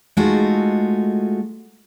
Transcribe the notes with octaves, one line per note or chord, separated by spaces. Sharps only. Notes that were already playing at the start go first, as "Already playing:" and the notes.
G#3 A3 D#4 F4 F#4